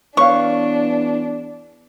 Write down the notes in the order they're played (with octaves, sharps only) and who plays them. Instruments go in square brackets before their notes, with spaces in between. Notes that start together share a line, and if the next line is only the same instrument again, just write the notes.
[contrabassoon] E2 [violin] D4 [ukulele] B4 C#5 F5 [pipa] C#6